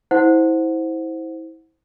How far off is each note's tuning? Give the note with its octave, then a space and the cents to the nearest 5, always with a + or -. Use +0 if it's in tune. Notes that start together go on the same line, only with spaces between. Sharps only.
E4 -25 C5 +0 F#5 -15